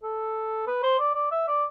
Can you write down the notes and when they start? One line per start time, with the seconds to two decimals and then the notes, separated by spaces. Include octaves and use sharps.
0.03 A4
0.67 B4
0.83 C5
0.99 D5
1.15 D5
1.31 E5
1.48 D5